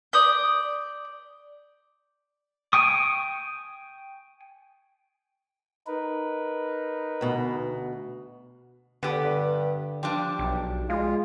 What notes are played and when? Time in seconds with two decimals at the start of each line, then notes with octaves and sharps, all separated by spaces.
0.13 D5 D#6 G6
2.73 G5 G#5 C#6 D#6
5.87 D#4 A#4 B4
7.21 D2 B2
9.03 D3 B3 G4
9.25 G2
10.03 F3 G3 D4 G4
10.39 B1
10.90 G#3 F4